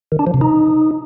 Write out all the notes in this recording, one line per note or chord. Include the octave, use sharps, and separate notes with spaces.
D#3
D4
F3
C3
D#4